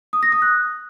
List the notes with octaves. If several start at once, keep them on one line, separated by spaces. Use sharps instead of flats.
D#6
A#6
D#6
F#6